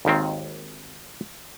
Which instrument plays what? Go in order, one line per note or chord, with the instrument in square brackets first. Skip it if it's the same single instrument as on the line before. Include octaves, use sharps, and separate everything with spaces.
[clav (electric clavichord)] G#1 D#2 D#3 C4